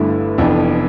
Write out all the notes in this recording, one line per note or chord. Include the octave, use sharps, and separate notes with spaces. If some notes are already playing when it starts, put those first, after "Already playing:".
Already playing: G1 G2 D3 A3 E4
F1 F2 E3 B3 D4